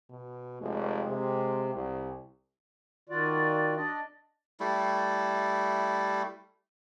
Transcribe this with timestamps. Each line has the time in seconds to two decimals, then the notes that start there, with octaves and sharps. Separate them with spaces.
0.10 B2
0.61 F1 G#3
1.09 C3
1.75 C2
3.09 D#3 F4 F#4 D5
3.76 D4 D5 D#5
4.60 G3 A3 E4